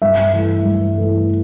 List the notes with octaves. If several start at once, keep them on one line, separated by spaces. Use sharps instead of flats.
G2 E5
E3 A3
G2
E3 A3